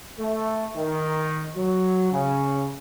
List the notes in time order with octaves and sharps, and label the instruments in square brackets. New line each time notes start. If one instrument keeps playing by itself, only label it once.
[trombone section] A3
D#3
F#3
C#3